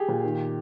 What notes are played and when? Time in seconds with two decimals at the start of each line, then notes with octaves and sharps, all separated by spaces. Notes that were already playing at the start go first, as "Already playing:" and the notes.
Already playing: G4 G#4
0.08 A#2
0.24 D#3